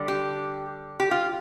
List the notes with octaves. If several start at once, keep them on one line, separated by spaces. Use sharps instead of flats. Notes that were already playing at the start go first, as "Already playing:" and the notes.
Already playing: D3 G3 D4
G4
G4
F4